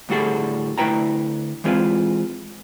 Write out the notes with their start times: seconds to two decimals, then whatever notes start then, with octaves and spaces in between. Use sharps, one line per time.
0.09 D2 A2 G3 F#4 G#4 A4
0.78 D2 A3 E4 B4 G5 A#5
1.64 E3 G#3 C4 F4 B4